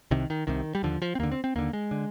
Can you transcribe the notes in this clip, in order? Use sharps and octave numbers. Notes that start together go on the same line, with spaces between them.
C2 C3 D#3
D#3
C2 C3 D#3
G3
D#2 D3 F3
F3
C4
D#2 D3 A#3
C4
C4
D#2 D3 A#3
G#3
D3